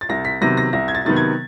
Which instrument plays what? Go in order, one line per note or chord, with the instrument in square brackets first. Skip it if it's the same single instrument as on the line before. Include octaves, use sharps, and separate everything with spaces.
[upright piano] A6
C2 A#6
B6
C3 D#3 F#3 B3 A#6
A#6
C2 A#6
G#6
A6
C3 D#3 F#3 B3 A6
G#6